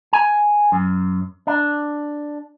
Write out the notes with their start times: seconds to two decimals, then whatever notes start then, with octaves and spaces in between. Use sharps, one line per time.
0.13 G#5
0.72 F#2
1.47 D4